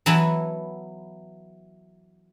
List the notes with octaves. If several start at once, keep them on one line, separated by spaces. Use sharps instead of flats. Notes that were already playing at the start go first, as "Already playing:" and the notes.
E3 F#3 B3 E4 A4